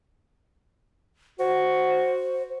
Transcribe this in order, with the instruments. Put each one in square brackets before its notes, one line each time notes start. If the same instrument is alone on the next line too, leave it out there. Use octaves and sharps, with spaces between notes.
[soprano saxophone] F#4 [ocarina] C5